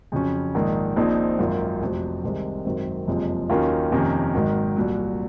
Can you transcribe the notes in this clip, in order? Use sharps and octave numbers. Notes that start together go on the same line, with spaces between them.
F2 C#3 F#3 C#4
A#1 G#2 D#3
A#1 A#2 F3 C4 D#4
G#1 F#2 D#3 A#3 F4
F1 F2 C3 F#3 C4
C2 C3 D#3 G#3 C4
G#1 F#2 D#3 F#3 C4
F#1 F2 C3 F3 G#3
D#2 D#3 F#3 C#4 F4
F2 C3 D#3 A#3 C#4
G#1 G#2 D#3 F#3
C2 A#2 F#3